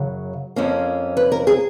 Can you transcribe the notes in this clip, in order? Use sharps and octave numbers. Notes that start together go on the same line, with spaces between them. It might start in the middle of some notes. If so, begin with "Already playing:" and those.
Already playing: F#2 C#3 F#3
F2 F3 A#3 C#4
B4
A#4
G#4